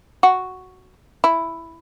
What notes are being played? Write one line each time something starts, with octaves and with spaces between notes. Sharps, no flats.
F#4
E4